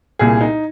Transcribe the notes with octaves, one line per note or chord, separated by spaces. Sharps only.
C2 A#2 G#4
D#4